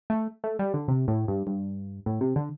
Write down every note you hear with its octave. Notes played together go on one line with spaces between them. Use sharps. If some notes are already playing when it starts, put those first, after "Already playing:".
A3
A3
G3
D3
C3
A2
G2
G2
A2
C3
D3